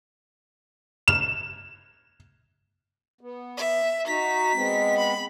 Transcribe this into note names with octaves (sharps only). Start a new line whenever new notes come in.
E7
B3
E5
D#4 F#4 A#5 B6
G#3 B3 C4
B5